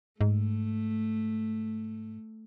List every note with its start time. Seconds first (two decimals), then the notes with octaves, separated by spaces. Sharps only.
0.21 G#2 A3